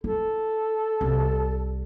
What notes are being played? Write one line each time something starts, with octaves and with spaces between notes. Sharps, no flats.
E4 A4
C2